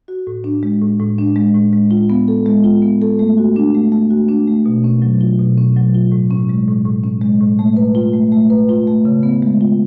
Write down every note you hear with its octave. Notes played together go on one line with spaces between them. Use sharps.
F#4
A2
D4
G#3
A2
A2
D4
G#3
A2
G#3
F4
B3
A4
G#3
F4
B3
A4
A3
F#4
D4
A3
A3
F#4
D4
A3
B2
C#4
F#3
F4
B2
C#4
F#3
F4
A2
C#4
G#3
A2
A2
C#4
G#3
A2
A3
B4
F4
A3
A3
B4
F4
A3
C#3
B3
G#3
F4